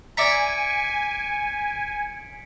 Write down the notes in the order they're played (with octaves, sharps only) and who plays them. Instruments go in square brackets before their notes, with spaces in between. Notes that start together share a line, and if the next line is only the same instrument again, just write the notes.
[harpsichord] D5 E5 A#5 [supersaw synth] G#5 [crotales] B6 C#7 D7